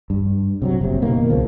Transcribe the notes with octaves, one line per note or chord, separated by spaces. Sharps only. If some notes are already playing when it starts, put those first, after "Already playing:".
G2
C3 F3 F#3
F#1 C3
B2 D#3 A#3
C#2 C#3 F3